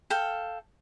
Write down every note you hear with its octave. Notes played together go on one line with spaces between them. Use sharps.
A4 F5 G5